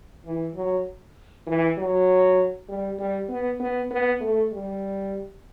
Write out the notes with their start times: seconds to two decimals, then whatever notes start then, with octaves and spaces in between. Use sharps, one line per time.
0.25 E3
0.55 F#3
1.47 E3
1.78 F#3
2.69 G3
2.99 G3
3.29 B3
3.60 B3
3.91 B3
4.20 A3
4.52 G3